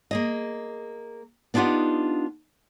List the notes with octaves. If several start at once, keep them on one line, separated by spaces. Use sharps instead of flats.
A#3 G#4 D#5
B3 D4 D#4 F4 G4 F#5